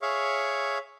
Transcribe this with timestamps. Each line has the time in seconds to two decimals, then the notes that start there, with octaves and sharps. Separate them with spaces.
0.02 G#4 C#5 E5 F5 C#6